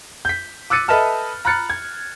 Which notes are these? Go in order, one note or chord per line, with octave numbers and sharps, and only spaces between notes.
G6 B6
D6 E6 F#6 A6 C#7 D#7
A4 B4 D#5 E5 A5 F6
A#5 B5 F6 F#6 A6 C#7
G#6